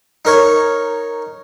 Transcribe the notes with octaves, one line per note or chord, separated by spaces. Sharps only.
D#4 A#4 C#5